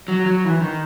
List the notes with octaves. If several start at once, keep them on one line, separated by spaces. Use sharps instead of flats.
F#3
F#3
E3
D#3